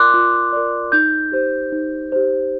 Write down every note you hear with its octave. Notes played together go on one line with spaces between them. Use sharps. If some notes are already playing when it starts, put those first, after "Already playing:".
Already playing: F4 A#4 D5 C6 D6 F#6
F4
A#4 D5
D#4 G6
G4 C5
D#4
G4 C5